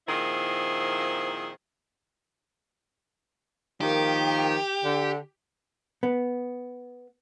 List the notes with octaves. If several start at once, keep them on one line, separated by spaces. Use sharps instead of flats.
A#2 D#3 F3 C4 E4 G#4
D#3 F3 A#3 G4
D3
B3